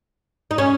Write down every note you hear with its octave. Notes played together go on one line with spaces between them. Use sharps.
D#4
C#4